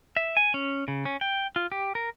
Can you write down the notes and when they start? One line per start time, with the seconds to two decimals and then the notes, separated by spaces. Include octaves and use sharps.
0.17 E5
0.37 G#5
0.54 C#4
0.88 C#3
1.05 C#4
1.21 G5
1.56 F4
1.72 G4
1.95 A#4